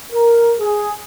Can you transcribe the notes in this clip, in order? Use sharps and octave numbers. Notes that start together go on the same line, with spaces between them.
A#4
G#4